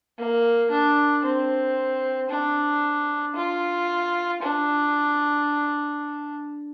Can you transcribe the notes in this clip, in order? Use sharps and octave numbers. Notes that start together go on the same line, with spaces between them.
A#3
D4
C4
D4
F4
D4